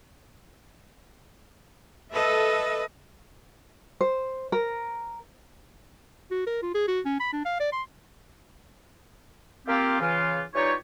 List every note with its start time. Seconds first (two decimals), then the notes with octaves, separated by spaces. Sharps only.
2.13 A4 B4 D#5 E5
4.01 C5
4.52 A#4
6.31 F#4
6.47 A#4
6.63 F4
6.75 G#4
6.88 F#4
7.05 C#4
7.20 B5
7.33 D4
7.45 F5
7.60 D5
7.72 C6
9.67 A#3 C4 F4 G4
10.00 C#3 E3 F4
10.54 E3 G3 D#4 F4 G4 C#5